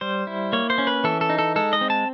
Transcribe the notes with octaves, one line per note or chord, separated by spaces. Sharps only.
G3 C5
E4
A#3 C#5
C5
C#4
B4
E3 A4
A4
D#4
A4
G#3 A4
D#5
C4
A5